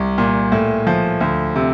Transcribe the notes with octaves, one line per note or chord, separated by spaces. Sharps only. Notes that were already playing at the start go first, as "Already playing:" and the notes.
Already playing: C2
A#2
A2
F3
D2
C3